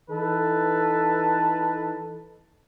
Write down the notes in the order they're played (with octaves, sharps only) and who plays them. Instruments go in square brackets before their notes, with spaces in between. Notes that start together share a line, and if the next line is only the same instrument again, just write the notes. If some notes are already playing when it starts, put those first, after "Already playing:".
[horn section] E3 D#4 A4 B4 A5